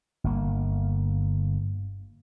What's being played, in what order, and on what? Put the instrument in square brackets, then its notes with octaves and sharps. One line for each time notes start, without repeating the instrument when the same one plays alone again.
[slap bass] G1 A#3